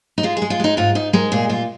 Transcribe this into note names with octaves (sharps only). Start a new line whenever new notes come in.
D#4
G#3 F4
G#4
G#3
F4
G#3 D#4
G#2 F4
G#2 D#4
G#3 A#4
A#2 G#4
A#2 F4